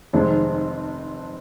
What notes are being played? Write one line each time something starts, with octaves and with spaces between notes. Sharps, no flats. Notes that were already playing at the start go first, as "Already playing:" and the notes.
F1 F2 D#3 G#3 C4